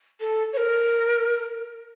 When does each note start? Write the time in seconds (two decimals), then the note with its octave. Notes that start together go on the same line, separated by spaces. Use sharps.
0.20 A4
0.53 C#5
0.57 A#4